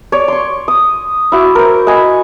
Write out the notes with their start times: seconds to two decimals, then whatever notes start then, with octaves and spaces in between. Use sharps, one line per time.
0.12 C#5 D5
0.28 C6 C#6
0.68 D#6
1.32 E4 F#4 D6
1.55 A#4 C5
1.87 D#5 F#5 G#5 B5